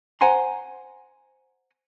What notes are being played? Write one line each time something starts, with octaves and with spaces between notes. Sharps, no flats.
C5 F#5 G#5 A#5 C6